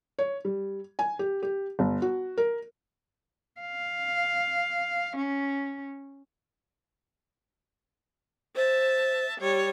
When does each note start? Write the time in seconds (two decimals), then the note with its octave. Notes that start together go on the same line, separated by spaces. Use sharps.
0.19 C#5
0.45 G3
0.99 G#5
1.19 G4
1.42 G4
1.79 G1
2.02 F#4
2.38 A#4
3.61 F5
5.16 C#4
8.56 C5 E5 A5
9.39 G3 C#5